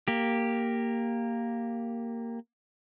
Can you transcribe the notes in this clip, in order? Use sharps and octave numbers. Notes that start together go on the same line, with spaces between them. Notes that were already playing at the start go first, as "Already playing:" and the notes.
A#3 G4